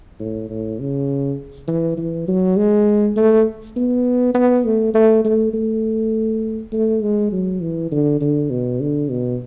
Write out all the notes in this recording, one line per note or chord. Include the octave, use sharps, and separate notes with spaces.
A2
A2
C#3
E3
E3
F#3
G#3
A3
B3
B3
A3
A3
A3
A3
A3
G#3
F#3
E3
D3
D3
B2
D3
B2